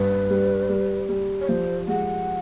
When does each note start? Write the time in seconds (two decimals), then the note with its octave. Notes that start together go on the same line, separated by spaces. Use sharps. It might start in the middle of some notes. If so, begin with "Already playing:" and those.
Already playing: G2 B4
0.30 G3
0.69 G3
1.09 G3
1.41 C#5
1.48 F3 C5
1.88 G#3 F#5